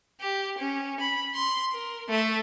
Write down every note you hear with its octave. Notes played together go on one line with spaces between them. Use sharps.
G4
C#4
B5
C6
A#4
A3 E5